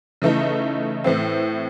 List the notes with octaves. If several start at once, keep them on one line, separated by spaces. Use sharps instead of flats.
C#3 E3 A3 D#4
A2 E3 C4